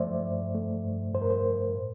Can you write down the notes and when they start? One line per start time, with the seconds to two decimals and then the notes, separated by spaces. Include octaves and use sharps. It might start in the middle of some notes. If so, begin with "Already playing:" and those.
Already playing: G2 F3 A3 C5 D5 E5
0.24 G2
0.54 A3
0.84 G2
1.14 G2 C5
1.22 A#4
1.30 C5
1.44 G2
1.74 A2